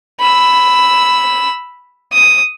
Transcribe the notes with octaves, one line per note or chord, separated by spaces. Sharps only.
B5 E6
D#6